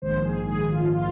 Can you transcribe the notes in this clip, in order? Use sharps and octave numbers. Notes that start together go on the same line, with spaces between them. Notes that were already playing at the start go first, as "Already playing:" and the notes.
A#1 G#2 D#3 C5
G#4
G#4
F4
F4